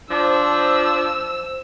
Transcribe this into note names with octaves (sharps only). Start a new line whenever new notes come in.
F3 D4 C5 E6